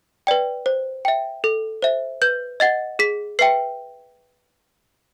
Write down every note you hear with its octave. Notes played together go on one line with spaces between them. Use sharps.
B4 D5 G5
C5
E5 G5
A4
C5 E5
B4 G6
D#5 F#5 A6
G#4 B6
B4 E5 G5 C7